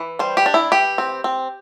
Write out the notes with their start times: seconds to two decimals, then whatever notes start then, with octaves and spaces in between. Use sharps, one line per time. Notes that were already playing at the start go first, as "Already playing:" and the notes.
Already playing: E3
0.19 G3 C5
0.37 G4
0.46 D4
0.54 E4
0.72 E3 G4
0.98 C4
1.24 C4